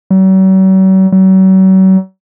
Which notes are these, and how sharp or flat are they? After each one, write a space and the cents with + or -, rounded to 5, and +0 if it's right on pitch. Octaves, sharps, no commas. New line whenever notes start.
F#3 +45
F#3 +40